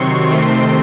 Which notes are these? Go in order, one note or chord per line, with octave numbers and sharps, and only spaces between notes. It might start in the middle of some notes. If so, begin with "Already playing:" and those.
Already playing: C3 D#3 F#3 C4 C6 C#6
C3 D#3 A3 C4 C6